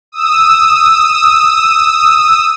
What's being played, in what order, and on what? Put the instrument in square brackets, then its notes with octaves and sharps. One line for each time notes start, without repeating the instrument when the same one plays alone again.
[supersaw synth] D#6 E6